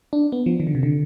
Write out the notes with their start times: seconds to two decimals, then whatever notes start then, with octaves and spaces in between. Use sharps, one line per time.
0.13 D4
0.32 B3
0.46 F3
0.60 D#3
0.67 D3
0.75 C3
0.83 D3